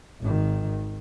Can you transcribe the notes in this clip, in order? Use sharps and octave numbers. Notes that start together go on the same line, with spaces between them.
G#1 D#3